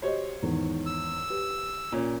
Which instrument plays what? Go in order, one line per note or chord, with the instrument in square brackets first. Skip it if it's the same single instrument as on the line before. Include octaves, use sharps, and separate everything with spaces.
[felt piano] F#4 G4 D#5 [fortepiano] C5 C#5
[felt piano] E2 G#2 D#3
[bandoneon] E6
[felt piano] G4 B4
[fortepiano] A#2 C#4